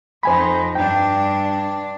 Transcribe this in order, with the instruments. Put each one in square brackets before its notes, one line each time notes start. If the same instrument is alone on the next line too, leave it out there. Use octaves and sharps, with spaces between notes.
[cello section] F2 D#4 [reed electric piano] C5 G#5 B5
[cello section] G2 D4 [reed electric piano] G5